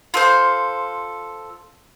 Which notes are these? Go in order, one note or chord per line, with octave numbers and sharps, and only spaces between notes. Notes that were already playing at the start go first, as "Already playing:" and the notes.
F4 A4 C5